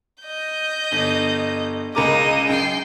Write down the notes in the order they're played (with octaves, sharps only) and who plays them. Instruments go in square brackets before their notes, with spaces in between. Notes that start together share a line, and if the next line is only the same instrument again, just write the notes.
[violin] D#5 G6
[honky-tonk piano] G1
[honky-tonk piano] C#2 A#4 D6 [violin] D#5 D#7
[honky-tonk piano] F#2 [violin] G5 C7